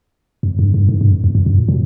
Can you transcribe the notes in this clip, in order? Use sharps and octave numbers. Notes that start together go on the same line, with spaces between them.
F2
G2
G2
G#2
G2
F2
E2
F2
F#2
A#2
B2